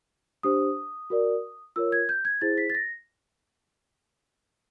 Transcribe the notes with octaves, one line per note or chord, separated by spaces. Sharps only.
D4 G4 C5 D#6
F#4 A#4 D5
F4 A#4 C#5 E6
G#6
G6
G#6
E4 G#4 C5 A6
B6
A6
A#6